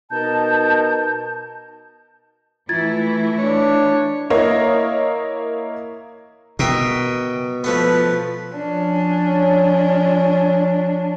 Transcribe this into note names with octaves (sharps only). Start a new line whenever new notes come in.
B2 D#4 A#4 A5 G6
E3 A3 E4 F4 G#6 A6
D4 C#5
A#3 E4 A#4 C#5 D#5 F5
B2 A#4 E5 G5
F3 A3 B3 B4
F3 C#4 D4